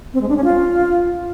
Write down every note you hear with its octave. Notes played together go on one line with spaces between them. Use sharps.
C4
G#3
D4
C#4
F4